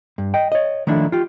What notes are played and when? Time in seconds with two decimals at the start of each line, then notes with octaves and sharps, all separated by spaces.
0.18 G2
0.34 D#5 G5
0.52 C#5 D#5
0.87 D#3 F3 A3 D4 E4
1.12 F4 G4